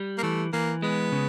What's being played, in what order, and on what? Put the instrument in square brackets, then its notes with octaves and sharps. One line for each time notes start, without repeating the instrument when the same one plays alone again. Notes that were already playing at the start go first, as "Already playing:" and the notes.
Already playing: [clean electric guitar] G3
[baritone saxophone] A#3
[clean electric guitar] E3 [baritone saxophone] A3
[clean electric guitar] E3 [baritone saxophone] A#3
[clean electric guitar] G#3 [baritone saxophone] B3
[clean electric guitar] C#3